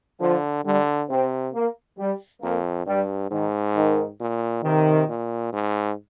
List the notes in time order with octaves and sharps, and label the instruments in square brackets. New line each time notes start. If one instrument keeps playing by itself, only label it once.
[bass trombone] D3 [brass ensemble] F3
[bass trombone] D3 [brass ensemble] G3
[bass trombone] C3 [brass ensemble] C4
[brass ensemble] A#3
G3
[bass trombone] F2 [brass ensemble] A#3
[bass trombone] G2 [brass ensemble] G3
[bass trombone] G#2 [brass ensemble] D#3
[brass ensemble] D#3
[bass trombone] A#2
[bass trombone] C3 [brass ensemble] D#3
[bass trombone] A#2
G#2